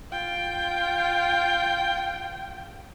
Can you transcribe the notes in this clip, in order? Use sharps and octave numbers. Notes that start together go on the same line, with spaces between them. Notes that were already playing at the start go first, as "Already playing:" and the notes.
F4 G5